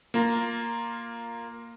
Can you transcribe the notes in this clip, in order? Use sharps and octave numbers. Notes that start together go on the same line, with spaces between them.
A#3 F4 A#5